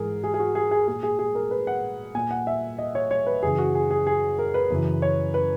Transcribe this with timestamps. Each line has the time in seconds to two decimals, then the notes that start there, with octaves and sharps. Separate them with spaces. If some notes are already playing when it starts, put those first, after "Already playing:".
Already playing: G#2 E3 G#4 A#4
0.24 G#4
0.34 G#4
0.40 F#4
0.55 G#4
0.71 G#4
0.87 A#2 G#4
1.03 G#4
1.19 G#4
1.35 A#4
1.51 B4
1.67 F#5
2.15 A#2 G#5
2.31 F#5
2.47 E5
2.79 D#5
2.95 C#5
3.11 C#5
3.27 B4
3.42 F#2 C#3 E3 G#4
3.58 F#4
3.75 G#4
3.91 G#4
4.07 G#4
4.39 A#4
4.54 B4
4.70 F#2 C#3 E3
5.02 C#5
5.34 B4